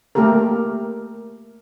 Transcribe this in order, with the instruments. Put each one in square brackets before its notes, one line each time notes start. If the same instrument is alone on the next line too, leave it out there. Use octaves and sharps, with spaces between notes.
[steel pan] A3 A#3 G4 A4 A#4